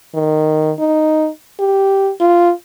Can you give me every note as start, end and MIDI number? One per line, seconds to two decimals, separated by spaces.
0.14 0.72 51
0.79 1.29 63
1.60 2.11 67
2.21 2.52 65